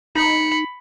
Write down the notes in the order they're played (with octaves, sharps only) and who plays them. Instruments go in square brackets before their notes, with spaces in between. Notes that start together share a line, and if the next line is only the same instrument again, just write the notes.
[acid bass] D#4 [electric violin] B5 C#7